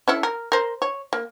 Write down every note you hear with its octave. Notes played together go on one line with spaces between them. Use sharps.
C#4 E4 A4
A#4
A#4 C5
C#5
A#3